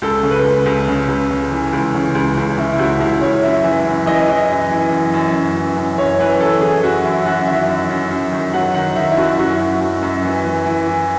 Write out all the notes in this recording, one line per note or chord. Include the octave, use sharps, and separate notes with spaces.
C#2 A4
C#3
B4
C#2
C#2
C#3
C#2
C#3
E3
C#2
C#3
C#2
C#2
C#3 E5
E4
C#2 F#4
C#2 E4
C#2 C#5
F#2 E5
E3 E5
F#2
E3 D#5
E3 D#5
F#2
E3
F#2
F#2
F#2
E3
F#2
F#2 C#5
E3 B4
F#2 A4
E3 G#4
F#2 F#4
F#2 E4
F#2 F#4
D#3 E5
F#2
F#2
F#2
D#3
F#3 F#5
D#3 F#5
D#3 E5
E4
F#2 F#4
F#2 F#4
F#2
F#2
F#2
E3
E3
E3
E3